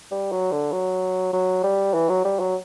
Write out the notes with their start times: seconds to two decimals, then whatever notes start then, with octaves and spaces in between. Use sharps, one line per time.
0.12 G3
0.32 F#3
0.52 D3
0.72 F#3
1.33 F#3
1.64 G3
1.94 E3
2.09 F#3
2.25 G3
2.40 F#3